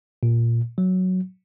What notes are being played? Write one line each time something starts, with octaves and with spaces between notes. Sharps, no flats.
A#2
F#3